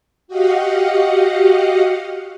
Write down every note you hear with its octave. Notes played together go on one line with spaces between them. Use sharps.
F#4 G4 D#5 F5 F#5